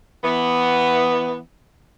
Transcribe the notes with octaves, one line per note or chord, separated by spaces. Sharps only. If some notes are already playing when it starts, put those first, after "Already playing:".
E3 B3